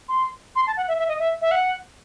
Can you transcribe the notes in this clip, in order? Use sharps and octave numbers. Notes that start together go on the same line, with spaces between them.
C6
C6
A5
F#5
E5
E5
D#5
E5
E5
F#5